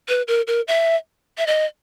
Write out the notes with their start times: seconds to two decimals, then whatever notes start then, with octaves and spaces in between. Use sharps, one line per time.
0.08 B4
0.28 A#4
0.47 A#4
0.68 E5
1.38 E5
1.47 D#5